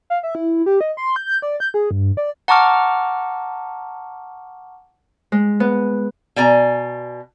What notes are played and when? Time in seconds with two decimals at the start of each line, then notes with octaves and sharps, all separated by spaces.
0.10 F5
0.23 E5
0.35 E4
0.66 G4
0.81 D#5
0.97 C6
1.16 G6
1.42 D5
1.60 G6
1.74 G#4
1.91 G2
2.17 D5
2.48 F#5 A5 A#5 C#6 D6 F6
5.32 G#3
5.60 B3
6.36 B2 D5 G#5 A#5